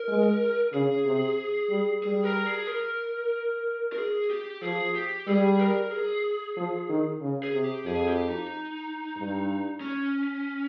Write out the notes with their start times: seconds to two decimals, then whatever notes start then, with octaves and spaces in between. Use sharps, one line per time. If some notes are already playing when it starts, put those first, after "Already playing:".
Already playing: A#4
0.08 G#3
0.73 C#3 G#4
1.06 C3
1.70 G3
2.03 G3 G#4
2.24 A#4
2.47 G#4
2.67 A#4
3.93 A#4
3.98 G#4
4.30 G4
4.62 F3 G#4
4.95 G4
5.27 G3 G#4
5.59 A#4
5.91 G#4
6.56 F3
6.89 D#3
7.21 C#3
7.43 G#4
7.54 C3
7.64 G4
7.85 F2 G#4
8.08 G4
8.29 D#4
9.16 G2
9.81 C#4